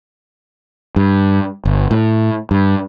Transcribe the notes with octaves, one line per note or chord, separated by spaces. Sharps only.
G2
G1
A2
G2